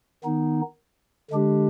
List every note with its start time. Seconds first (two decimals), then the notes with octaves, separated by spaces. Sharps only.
0.24 D#3 B3 D#4
1.31 D3 G#3 D4 G4